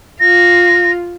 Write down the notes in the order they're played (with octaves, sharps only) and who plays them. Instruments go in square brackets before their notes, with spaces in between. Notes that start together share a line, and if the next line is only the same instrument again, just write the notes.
[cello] F4 [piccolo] A#6